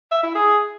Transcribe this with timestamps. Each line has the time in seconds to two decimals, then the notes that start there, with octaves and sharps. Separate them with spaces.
0.11 E5
0.23 E4
0.35 G#4